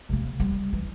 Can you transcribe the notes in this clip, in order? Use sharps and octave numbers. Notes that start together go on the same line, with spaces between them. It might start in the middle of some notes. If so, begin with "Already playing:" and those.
C3 A#3
G3
E3